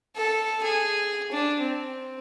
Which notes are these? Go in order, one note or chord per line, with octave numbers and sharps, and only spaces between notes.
A4
G#4
D4
C4